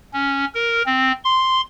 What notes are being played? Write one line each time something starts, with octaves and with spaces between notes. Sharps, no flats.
C#4
A#4
C4
C6